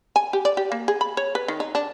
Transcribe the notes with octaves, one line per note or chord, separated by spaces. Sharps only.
G#5
G4
D5
G4
A#3
G#4
B5
C#5
B4
D#3
D#4
D4